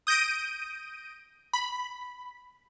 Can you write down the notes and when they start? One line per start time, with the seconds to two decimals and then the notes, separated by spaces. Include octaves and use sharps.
0.07 D#6 G6 A#6 D7 D#7
1.53 B5